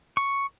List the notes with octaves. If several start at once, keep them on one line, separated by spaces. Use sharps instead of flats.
C#6